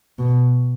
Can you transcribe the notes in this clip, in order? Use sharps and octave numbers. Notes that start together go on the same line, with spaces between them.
B2